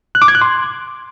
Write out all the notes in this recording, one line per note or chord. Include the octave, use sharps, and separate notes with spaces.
F#6
D6
G#6
F#6
C6